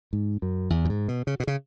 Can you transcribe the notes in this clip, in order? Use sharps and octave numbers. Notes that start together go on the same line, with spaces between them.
G#2
F#2
E2
F#2
G#2
B2
C#3
B2
C#3